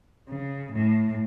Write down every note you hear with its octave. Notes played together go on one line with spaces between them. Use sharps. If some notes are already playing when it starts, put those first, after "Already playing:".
C#3
A2